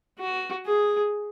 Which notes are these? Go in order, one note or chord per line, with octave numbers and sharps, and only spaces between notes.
F#4
G#4